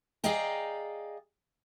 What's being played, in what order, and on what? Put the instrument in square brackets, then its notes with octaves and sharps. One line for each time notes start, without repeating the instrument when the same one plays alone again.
[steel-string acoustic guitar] G#4 D5 D#5 F5 G5 A#5